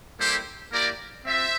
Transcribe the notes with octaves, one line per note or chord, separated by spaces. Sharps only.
G3 A#3 E4 G4 A4 C5
A#3 E4 G4 A#4 D5
C4 F4 C5 E5